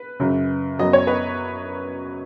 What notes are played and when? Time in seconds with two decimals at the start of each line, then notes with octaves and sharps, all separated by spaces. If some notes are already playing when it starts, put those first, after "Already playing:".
Already playing: B4
0.20 F#2 C#3 F#3
0.79 F#2 F#3 B3 D#5
0.93 C#5
1.07 B4 D#5